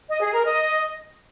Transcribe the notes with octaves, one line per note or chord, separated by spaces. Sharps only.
D#5
G#4
A#4
D#5